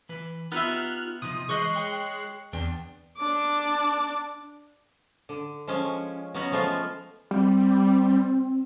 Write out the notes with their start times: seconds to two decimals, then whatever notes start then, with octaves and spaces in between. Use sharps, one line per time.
0.09 E3 B4
0.52 B3 D#4 F4 G4 E5 F6 F#6
1.22 C3 F3 D#4 D#6
1.49 E3 G#3 C5 D#5 C#6 F#6 C7
1.76 C#5 G5
2.53 E2 C4 D4 G5
3.17 D4 D6
5.29 D3
5.68 F3 G#3 C#4
6.34 F#3 B3 C#4 F#4 D#5
6.52 F3 G#3 A3 F4
7.31 G3 C4